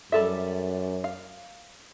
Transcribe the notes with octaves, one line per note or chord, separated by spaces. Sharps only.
F#2 G3 A4 E5
F5